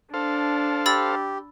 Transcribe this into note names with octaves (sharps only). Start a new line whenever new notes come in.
D4 A4 C5 F5
G4 B5 E6 A6